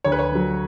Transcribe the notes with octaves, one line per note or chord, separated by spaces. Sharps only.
D2 C#5
B4
C#5
D3 F#3